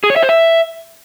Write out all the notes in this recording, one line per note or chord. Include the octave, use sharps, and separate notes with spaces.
G#4
C#5
E5
C5
E5